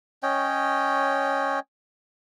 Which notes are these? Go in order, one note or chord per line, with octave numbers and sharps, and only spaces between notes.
C#4 C#5 D#5 G5